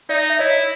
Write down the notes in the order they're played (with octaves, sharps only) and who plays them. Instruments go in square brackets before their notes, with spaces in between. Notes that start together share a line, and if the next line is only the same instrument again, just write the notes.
[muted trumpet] D#4 [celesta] D5 E5
[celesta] E5
[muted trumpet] E4 [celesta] C#5 D#5